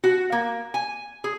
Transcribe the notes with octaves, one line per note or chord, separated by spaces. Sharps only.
F#4
A#3
G#5
G#4